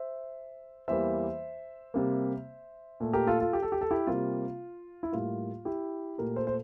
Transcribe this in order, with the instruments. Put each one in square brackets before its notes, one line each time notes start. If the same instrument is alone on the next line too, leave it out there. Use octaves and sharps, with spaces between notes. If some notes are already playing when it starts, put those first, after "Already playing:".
Already playing: [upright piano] C5 E5
E2 E3 G3 A#3 C5 E5
C3 G3 A#3
A#2 A3
G4 A#4
F4 A4
F4 A4
G4
A4
G4
A4
E4 G4
C3 G3 A#3 F4
E4
A2 G3 A#3 F4
E4 G4
A#2 A3 G4 A#4
A4 C5
C5